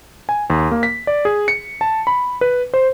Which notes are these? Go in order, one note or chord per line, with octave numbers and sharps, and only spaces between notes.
G#5
D#2
A#3
B6
D5
G#4
C#7
A5
B5
B4
C5